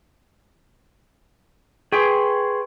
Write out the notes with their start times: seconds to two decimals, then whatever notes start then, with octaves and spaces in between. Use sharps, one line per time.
1.92 G#4 B4 G5 C6 C#6